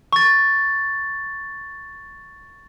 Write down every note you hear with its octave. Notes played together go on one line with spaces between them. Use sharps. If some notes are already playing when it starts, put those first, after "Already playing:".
C#6 A6